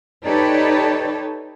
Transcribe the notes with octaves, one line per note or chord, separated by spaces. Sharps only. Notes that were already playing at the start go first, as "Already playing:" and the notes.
D#4 G4 A4 B4 C#5 D5